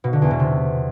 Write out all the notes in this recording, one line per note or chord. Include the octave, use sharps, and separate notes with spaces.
B2
D3
E2
B2
C3